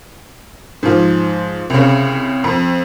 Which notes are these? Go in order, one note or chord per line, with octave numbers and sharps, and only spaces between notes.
G#2 F3
C2 C#3
F2